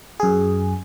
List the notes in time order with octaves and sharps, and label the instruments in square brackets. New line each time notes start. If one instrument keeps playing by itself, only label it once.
[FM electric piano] F#2 G#4